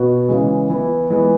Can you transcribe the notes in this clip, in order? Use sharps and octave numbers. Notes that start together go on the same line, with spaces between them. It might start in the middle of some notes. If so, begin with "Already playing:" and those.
Already playing: B2 B3 F#4
C#3 E3 G#3
E3 B3 E4
E3 G#3 B3